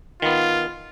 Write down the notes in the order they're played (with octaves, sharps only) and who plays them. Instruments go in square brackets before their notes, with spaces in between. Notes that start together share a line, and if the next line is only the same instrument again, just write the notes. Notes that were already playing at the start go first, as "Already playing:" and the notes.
[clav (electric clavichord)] D#3 B3 [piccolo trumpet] F4